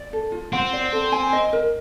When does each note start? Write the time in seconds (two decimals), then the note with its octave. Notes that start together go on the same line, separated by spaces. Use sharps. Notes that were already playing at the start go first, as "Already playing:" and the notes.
Already playing: D5
0.13 A4
0.32 F4
0.53 C4 F#5
0.73 D5
0.92 A4
1.12 G#5
1.33 D#5
1.53 A#4